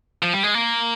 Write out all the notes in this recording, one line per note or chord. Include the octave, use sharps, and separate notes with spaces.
F3
G3
G#3
A#3